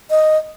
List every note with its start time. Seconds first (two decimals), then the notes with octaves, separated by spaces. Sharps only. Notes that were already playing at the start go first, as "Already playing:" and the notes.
0.10 D#5